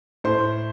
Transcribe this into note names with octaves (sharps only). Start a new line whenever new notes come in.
A2 C5 C6